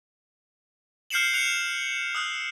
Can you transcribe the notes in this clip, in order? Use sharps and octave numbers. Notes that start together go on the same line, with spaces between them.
F6 G6 C7 C#7 E7 F#7
F#6 C#7 F7
D#6 E6 F#6